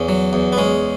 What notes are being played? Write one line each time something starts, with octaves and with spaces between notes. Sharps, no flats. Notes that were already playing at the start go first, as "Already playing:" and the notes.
Already playing: E2 C#4
F#3
E2
B3
G#3 C#4